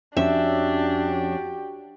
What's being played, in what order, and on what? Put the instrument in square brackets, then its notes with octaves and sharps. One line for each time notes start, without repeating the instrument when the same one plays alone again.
[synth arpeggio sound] F2 C#4 [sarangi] D4 [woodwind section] F#4 G4 G5 [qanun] E5